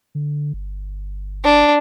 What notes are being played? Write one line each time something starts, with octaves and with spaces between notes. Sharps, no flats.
D3
G1
D4